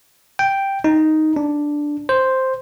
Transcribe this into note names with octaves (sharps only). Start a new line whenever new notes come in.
G5
D#4
D4
C5